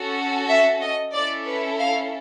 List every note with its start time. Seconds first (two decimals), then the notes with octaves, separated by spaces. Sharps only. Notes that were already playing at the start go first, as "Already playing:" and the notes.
Already playing: C#4 F#4 A4
0.48 E5
0.81 D#5
1.13 C#4 E4 A4 D5
1.47 B4
1.80 F5